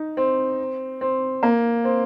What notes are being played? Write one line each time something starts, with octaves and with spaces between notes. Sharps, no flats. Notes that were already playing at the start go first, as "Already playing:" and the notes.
Already playing: D#4
C4
C4
A#3
C4